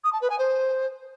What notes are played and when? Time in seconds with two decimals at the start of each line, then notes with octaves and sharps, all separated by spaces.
0.04 D#6
0.12 A5
0.21 B4
0.30 G#5
0.38 C5